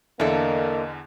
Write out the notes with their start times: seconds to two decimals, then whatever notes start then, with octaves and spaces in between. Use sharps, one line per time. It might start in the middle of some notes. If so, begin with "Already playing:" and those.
0.20 E2 D3 A#3 D4 E4 A4 D#5